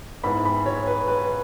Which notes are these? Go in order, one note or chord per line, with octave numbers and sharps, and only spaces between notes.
G#2 G#3 B3 E4 B5
B5
C#5
B4
B4